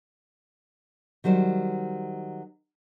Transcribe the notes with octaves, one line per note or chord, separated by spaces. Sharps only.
D#3 F#3 G3 C5